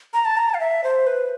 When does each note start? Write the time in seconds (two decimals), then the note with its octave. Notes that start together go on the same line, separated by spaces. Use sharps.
0.14 A#5
0.25 A5
0.37 A#5
0.50 A5
0.54 F5
0.60 E5
0.84 C5
1.07 B4